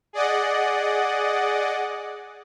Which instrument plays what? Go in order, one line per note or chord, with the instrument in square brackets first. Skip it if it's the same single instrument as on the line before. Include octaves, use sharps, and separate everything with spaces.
[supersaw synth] G#4 D5 D#5 F#5